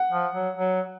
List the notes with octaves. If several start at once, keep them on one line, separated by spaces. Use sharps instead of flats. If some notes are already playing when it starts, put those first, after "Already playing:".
Already playing: F#5
F3
F#3
F#3